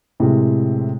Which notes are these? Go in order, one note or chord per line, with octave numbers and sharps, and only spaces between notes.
A2 C3 G#3